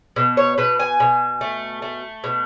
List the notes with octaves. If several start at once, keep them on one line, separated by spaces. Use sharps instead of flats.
B2
C#5
B2 B4
G#5
B2
A3
A3
B2